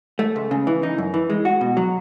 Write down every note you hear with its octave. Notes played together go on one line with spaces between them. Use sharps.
A3
C#2
C#3
E3
D#4
F#2
E3
G#3
F#4
B2
F#3